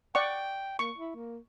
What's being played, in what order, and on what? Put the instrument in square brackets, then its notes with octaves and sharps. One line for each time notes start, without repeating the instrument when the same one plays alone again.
[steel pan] D5 F#5 C#6 [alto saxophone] G5
[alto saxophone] A#3 [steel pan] C#6
[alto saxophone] E4
A#3